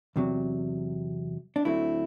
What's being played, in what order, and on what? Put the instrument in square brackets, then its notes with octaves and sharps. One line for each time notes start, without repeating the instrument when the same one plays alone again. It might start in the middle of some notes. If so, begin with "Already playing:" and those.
[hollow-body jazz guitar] E2 C3 F#3
D4
D2 D3 F#3 A3 C4 E4